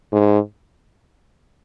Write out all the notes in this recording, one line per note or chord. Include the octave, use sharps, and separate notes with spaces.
G#2